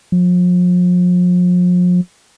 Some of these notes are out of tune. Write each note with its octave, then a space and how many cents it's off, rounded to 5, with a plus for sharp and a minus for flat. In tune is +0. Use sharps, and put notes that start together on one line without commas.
F3 +40